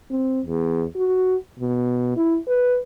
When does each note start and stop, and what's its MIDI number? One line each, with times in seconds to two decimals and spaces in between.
0.11 0.41 60
0.46 0.84 40
0.96 1.36 66
1.60 2.13 47
2.17 2.38 64
2.47 2.78 71